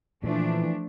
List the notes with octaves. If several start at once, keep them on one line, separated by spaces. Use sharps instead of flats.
A#2 E3 F3 A3 D4